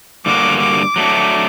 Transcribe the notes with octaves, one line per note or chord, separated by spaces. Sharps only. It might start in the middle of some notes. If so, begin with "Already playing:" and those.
G2 D3 G3 A#3 F#4 D6
D6
F#3 A3 D4